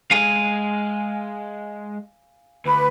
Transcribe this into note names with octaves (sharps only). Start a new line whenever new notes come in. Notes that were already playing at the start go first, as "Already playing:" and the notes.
G#3 F5 G#5
D2 B4